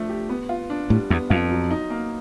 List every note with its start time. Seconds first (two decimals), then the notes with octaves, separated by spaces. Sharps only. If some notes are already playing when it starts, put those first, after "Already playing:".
Already playing: F3 A3 D4
0.09 G4
0.29 B3
0.49 F4
0.70 D4
0.90 A2 G3
1.10 E2 B3
1.30 F2 F4
1.51 F#3
1.70 D#4
1.90 A#3